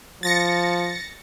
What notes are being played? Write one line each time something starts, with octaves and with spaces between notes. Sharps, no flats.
F3 A6 A#6 C#7